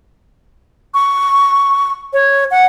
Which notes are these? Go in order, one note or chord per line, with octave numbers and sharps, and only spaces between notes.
C#6
C#5
F#5